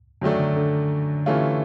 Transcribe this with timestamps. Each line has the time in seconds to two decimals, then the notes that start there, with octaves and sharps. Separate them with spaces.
0.21 F#2 D3 D#3 F#3 A3 D4
0.39 D3
0.56 D3
1.26 C3 E3 A3 C#4 F4